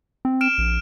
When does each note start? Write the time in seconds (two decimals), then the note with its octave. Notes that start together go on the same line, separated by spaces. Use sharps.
0.25 C4
0.41 F6 D7 E7
0.58 A#1